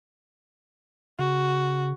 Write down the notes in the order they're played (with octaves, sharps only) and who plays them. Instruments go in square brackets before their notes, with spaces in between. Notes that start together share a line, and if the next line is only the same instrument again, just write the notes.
[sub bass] C#3 [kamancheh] F#4